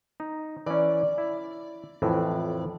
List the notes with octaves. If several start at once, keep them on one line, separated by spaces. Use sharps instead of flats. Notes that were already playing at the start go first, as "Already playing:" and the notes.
D#4
E3 C#4 D5
E4
F2 A2 E3